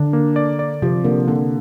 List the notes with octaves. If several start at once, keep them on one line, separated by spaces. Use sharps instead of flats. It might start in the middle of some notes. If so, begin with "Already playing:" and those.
Already playing: D3 D4
A#3
D5
D5
C3 F3
D3 A#3
D3 A#3